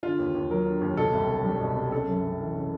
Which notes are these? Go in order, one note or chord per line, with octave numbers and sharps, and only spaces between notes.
D3 F4
D#2
D#2
F#3 A#4
D3
D#2
B2 A4
C2
C2
G3
B2
C2
C#3 A4
F#2
F#2
E3
C#3